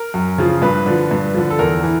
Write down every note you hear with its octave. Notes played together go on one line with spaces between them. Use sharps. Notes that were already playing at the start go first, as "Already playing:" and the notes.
Already playing: A#4
F#2
C#3 F3
G2 B4
D3 F3
G2
D3 F3
A4
E2 A#4
E3